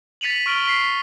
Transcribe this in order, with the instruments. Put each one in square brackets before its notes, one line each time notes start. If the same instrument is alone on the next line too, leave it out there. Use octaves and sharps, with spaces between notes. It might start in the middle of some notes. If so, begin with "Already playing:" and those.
[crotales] A6 B6 C#7 D#7 F7 F#7
C#6 F6 D7 F#7 G7
B6 C7